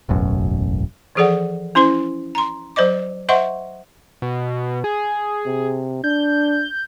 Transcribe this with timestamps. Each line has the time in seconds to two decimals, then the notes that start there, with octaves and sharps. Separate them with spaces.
0.09 E1 A1 F#2
1.15 E3 F3 G#4 A4 D5 F#5
1.75 C#4 E4 C5 C6
2.35 A#5 C6
2.76 F#3 C5 D5 D#5 D6
3.29 C5 D#5 E5 F#5 C6 C#6
4.22 B2
4.84 G#4
5.46 C3
6.04 D4 G6